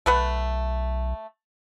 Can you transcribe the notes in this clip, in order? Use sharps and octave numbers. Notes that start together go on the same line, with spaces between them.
B1 A3 B4 F#5